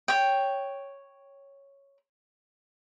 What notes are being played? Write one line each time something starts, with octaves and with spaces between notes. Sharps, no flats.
C#5 G5